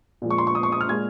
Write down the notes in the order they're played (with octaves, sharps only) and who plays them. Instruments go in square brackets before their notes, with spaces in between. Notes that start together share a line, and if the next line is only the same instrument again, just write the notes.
[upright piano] A#2 F3 G#3
C#6
C6
C#6
D#6
C#6
D#6
F6
A#2 G#3 G#6